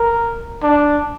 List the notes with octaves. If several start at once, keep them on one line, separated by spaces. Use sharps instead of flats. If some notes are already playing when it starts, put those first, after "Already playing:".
Already playing: A#4
D4